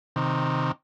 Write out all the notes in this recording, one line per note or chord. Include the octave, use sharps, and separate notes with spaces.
C3 D#3